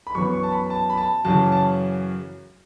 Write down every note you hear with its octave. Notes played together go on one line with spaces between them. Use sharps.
B5
F#2 E3 B3 C#6
C#6
A5
B5
A5
B5
A5
F#2 C#3 E3 A5
A5